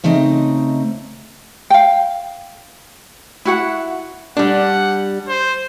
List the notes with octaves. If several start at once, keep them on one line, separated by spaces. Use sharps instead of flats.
C#3 A3 C4 D#4 D#5
F5 G5
E4 F#4 F#5
G3 D4 F#5
C5